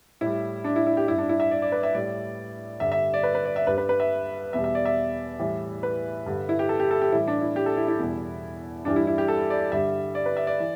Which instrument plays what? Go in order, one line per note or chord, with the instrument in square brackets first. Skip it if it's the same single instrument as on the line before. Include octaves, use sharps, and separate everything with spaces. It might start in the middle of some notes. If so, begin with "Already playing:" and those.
[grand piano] A2 G3 E4
D4
E4
E4
G4
G2 G3 E4
D4
E4
E5
D5
D5
B4
E5
A2 G3 D5
G2 D3 G3 E5
E5
D5
B4
B4
D5
E5
G2 G3 B4
B4
B4
E5
E2 B2 G3 E5
E5
D5
E5
A2 E3 G3
B4
G2 D3 G3
E4
G4
A4
G4
A4
G4
A2 E3 G3 E4
D4
E4
G4
A4
E4
E4
E2 B2 G3
G2 E3 G3 D4
E4
E4
G4
A4
D5
G2 D3 G3 E5
D5
B4
E5
D5
E3